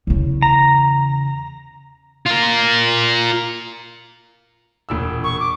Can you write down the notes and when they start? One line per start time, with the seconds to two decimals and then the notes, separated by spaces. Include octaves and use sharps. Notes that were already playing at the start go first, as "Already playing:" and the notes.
0.07 E2 C#3
0.42 A#5
2.26 F4 A#4
4.89 E1 A#2 E6
5.24 C#6
5.40 D6